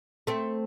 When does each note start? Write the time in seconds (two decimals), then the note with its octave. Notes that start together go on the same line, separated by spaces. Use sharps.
0.27 A3 C4